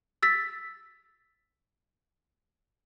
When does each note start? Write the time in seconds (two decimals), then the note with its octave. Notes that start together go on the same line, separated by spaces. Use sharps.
0.23 E6 A6 B6